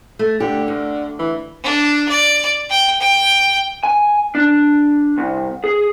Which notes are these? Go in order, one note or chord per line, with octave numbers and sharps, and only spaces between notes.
A3
D3 G4
D2
E3
D4
D5
G5
G5
G#5
D4
C2
G#4